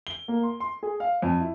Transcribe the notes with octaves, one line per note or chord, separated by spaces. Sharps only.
G7
A#3
C6
C6
G#4
F5
F2
E4